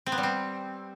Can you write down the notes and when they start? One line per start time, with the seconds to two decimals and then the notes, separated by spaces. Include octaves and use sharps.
0.06 C4
0.12 B3
0.18 G3
0.23 C4